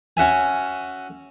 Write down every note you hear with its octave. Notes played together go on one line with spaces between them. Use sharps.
C#4 F#4 E5 G#5